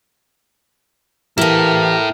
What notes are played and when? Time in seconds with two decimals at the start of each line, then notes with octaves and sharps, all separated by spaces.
1.38 E3 A#3 E4 G4 A4 A#4